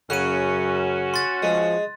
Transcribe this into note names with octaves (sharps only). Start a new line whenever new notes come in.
F#2 C#3 C#4 F#4 F#6 D#7
C6 A6
F3 G#3